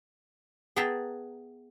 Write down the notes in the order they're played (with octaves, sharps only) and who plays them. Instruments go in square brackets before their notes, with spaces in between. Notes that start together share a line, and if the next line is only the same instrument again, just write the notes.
[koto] B3 G#4 E5 G5 A5 A#5